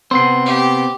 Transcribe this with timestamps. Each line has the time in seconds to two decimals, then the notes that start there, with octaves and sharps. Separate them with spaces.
0.11 C3 B3 C4 C6 C7
0.46 G4